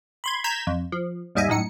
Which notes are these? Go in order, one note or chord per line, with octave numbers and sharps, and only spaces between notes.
B5 C6 G#6
A#5 G6 G#6 B6 E7
F2
F3
D#2 G#2 G3 D#5 E5 G#5
F#2 A2 D#4 C#7